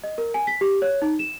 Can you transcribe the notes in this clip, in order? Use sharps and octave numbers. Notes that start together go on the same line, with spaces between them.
D#5
A#4
G#5
B6
G4
C#5
D#4
E7